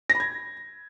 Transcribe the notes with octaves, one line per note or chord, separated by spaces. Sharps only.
A#6
B5
G#6